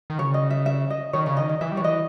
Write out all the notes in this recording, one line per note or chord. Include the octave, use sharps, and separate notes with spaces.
D#3
C#3 C#5
D#5
E5
E5
D#5
D#3 C#5
C#3 C#5
D#3 D#5
D#5
E3 E5
G3
C#5
E3 D#5